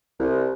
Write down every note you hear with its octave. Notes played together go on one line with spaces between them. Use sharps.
C2